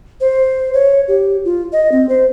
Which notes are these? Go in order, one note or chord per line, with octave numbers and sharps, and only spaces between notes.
C5
C#5
G4
F4
D#5
C4
C5